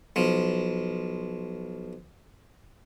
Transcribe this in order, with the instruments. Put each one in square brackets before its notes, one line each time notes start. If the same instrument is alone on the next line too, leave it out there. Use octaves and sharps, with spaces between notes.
[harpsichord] B1 F3